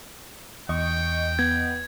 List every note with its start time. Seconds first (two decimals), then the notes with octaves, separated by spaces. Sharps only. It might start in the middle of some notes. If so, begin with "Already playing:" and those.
0.69 E2 D#5 G5 C#6
1.39 B3 G#6